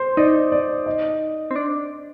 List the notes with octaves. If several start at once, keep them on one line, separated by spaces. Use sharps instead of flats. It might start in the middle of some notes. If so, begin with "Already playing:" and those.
Already playing: C5
D#4 D5
D5
D#5
C4
D4